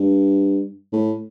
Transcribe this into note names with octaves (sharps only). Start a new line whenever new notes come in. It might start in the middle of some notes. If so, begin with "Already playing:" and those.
Already playing: G2
A2